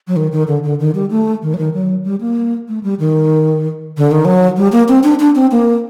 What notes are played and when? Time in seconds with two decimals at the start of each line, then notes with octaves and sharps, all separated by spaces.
0.08 F#3
0.16 D#3
0.32 D#3
0.48 D3
0.64 D3
0.80 D#3
0.95 G3
1.10 A3
1.42 D#3
1.54 F#3
1.58 D#3
1.74 F#3
2.04 G3
2.21 A#3
2.68 A3
2.83 G3
2.99 D#3
3.97 D3
4.11 D#3
4.25 F#3
4.57 G3
4.72 A#3
4.88 C4
5.03 D4
5.20 D4
5.35 C4
5.52 A#3